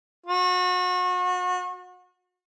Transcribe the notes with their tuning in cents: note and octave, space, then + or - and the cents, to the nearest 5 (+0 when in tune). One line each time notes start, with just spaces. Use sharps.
F#4 -35